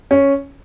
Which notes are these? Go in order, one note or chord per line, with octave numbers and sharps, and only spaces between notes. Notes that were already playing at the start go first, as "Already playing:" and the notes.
C#4